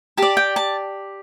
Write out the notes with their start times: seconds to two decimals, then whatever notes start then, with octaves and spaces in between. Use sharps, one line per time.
0.17 G4 D5 A5
0.37 G5
0.56 A5